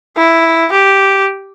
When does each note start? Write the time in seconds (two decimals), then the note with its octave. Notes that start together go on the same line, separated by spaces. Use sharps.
0.17 E4
0.72 G4